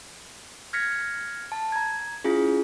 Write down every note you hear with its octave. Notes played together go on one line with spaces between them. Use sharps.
F6 G#6 A#6 B6 C#7
A5
A#5 G#6
C#4 E4 F4 G#4